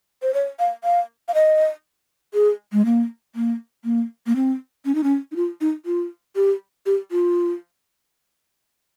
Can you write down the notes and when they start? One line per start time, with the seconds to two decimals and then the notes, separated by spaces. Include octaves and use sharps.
0.22 C5
0.34 C#5
0.59 F5
0.84 F5
1.28 F5
1.34 D#5
2.34 G#4
2.73 G#3
2.85 A#3
3.35 A#3
3.85 A#3
4.27 A#3
4.36 C4
4.85 C#4
4.95 D#4
5.03 C#4
5.32 D#4
5.36 F4
5.61 D#4
5.86 F4
6.36 G4
6.86 G4
7.11 F4